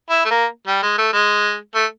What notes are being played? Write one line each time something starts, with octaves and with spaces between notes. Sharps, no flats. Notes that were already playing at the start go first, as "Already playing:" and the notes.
E4
A3
A#3
G3
G#3
A3
G#3
A3